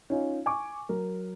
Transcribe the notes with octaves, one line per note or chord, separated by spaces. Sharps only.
C#4 D#4 F4
G#5 C#6 D6
F#3 A#4